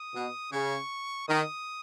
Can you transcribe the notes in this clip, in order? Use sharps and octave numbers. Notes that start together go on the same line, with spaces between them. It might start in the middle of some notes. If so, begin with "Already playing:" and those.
Already playing: D#6
B2
C#3 C#6
D#3 D#6